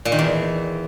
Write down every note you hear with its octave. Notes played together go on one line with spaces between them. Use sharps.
A#2
D#3
E2